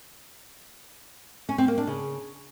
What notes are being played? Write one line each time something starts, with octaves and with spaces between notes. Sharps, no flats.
C#4
C4
A#3
D4
C#3